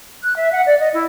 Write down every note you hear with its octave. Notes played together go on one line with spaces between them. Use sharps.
F#6
E5
F#5
D5
D#5
E4